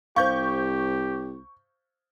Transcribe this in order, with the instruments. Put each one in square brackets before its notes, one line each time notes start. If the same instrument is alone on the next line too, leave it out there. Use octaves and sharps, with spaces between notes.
[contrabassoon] C2 [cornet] G4 [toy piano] C5 F5 [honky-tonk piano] C#6 G6